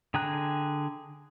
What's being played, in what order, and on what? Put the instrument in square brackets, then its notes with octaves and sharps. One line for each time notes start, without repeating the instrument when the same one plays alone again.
[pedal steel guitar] D3 G#4 G5 A#5 F#6